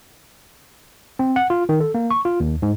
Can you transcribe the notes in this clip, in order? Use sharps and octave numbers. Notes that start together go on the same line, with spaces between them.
C4
F#5
F4
D#3
A4
A#3
C#6
F4
D#2
G#2